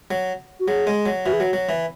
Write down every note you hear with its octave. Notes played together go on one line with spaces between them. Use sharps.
F#3
F#4
F#3 G#4
G#3
F#3
E3 F#4
G#4
F#3 F#4
F#3
E3